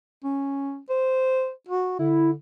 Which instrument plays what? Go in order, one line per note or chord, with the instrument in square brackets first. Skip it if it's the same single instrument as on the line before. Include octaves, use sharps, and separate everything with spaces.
[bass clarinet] C#4
C5
F#4
[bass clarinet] D3 [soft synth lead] E4